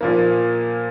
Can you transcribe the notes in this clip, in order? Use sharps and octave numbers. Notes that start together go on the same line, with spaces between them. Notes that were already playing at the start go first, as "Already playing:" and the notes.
A#2 F3 A#3